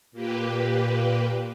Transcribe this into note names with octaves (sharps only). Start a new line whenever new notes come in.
A#2 A#3 G4 B4